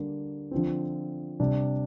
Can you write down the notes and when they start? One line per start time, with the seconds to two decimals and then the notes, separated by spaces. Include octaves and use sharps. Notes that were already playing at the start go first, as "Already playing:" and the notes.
Already playing: D3 G3 A#3 D4 G4
0.51 D3 F3 C4
1.40 C3 G3 D4